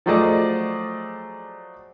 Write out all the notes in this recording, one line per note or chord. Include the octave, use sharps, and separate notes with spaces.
F3 F#3 A3 G#4 D5 D#5